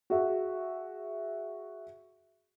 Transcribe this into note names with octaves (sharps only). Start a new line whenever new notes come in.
F#4 G#4 E5